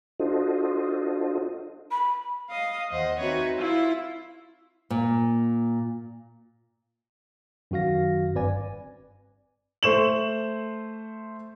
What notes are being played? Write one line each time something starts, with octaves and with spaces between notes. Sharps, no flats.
D4 F4 F#4 A4 C5 D#5
B5
D#5 F5 D#6
D#2 C5 D#5 F#5
C4 D#4 F#4 B4 C#5 E5
E4 F4 E5
A#2
F#2 D#3 F#4 F5 A#6
G1 G2 C4 B4 D5 G#5
A3 C5 C#6 E7 F#7